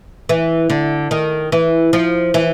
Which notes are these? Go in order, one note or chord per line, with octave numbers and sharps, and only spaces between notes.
E3
D3
D#3
E3
F3
E3